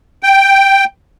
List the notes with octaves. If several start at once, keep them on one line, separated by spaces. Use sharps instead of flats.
G5